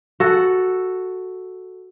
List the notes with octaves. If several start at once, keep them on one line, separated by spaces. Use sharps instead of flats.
F#4 A4